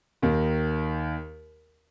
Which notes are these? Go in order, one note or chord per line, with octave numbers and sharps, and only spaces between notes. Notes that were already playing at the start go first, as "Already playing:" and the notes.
D#2 D#3